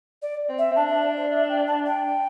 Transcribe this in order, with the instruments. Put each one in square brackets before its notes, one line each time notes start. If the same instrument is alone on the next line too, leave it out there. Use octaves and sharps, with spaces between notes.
[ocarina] D5
[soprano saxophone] C4
[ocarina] E5
[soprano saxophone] C4
[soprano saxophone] D4 [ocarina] A5
[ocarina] E5
D5
C5
E5
G5
A5
G5